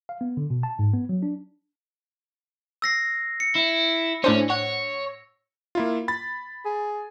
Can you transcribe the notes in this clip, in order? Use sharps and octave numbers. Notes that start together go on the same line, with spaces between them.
F5
B3
D3
B2
A5
G#2
B3
F#3
D4
E6 A#6 C7
C#7
E4
A2 C#4 D4 C5
C#5 F#5
A#3 E4 F4
B5 A6
G#4